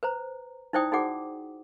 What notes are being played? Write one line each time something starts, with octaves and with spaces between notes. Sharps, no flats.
B4 C5 A#5
D#4 E4 C5 D5 G5 D#6
D#4 F#4 G#4 D5 F#5 D6